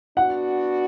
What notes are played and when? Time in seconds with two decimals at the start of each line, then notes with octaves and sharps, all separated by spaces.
0.17 B3 D4 F#4 F#5